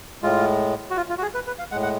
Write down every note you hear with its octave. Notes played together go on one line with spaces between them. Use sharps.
A2 G#3 F4
F#4
F4
F4
F#4
G#4
B4
B4
F5
A2 G#3 F#5
F#5